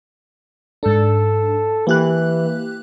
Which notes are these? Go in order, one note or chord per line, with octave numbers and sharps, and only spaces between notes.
G#2 D4 A4
E3 A#3 G4 F#6